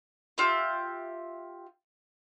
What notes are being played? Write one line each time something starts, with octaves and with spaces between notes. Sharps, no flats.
F4 G4 E5